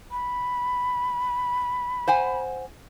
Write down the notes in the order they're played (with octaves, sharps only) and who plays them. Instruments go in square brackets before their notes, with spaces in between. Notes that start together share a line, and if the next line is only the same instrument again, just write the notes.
[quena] B5
[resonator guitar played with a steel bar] C5 F#5 G#5